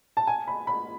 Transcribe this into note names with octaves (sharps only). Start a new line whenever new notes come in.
A5
G#5
B5
B5